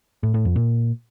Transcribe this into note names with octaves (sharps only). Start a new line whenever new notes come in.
A2
A2
F2
A#2